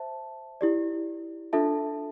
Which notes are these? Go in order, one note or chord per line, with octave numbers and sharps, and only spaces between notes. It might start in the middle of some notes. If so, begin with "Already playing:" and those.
Already playing: C5 E5 A5
E4 G4 D5
D4 F4 A4 E5 A5